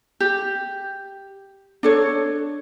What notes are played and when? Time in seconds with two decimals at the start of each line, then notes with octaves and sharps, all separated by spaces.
0.20 G4
1.83 D4 A4 C#5